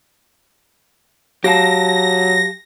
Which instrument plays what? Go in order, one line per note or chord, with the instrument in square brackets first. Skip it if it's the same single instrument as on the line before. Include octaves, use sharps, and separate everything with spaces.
[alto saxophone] F#3 [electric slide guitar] G4 F5 A5 [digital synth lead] A#6